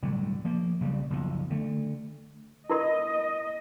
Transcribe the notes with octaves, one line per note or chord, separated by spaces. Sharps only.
G1 C2 A2 F#3
F3 A#3
B1 C#3 F3 G3
F#1 B1 F3
D3 A3
E4 A#4 D#5 B5